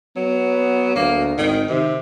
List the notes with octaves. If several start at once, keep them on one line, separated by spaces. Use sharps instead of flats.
F#3 B3
D2 A#3
G#1 D#3
C3 D#3